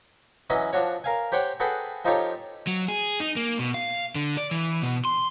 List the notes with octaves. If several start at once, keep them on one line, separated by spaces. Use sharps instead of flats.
E3 F#3 C#4 B4 D#5
F3 D4 F#4 C#5
A#4 F5 G#5
G4 C5 C#5 F#5 G5
F#4 G#4 A4 B4 F#5 G5
F3 D#4 F4 G4 A4 C#5
F#3
G#4
D#4
A#3
B2
F5
D3
D5
E3
B2
C6